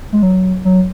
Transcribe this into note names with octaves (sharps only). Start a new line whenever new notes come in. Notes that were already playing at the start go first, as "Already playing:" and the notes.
G#3
F#3
F#3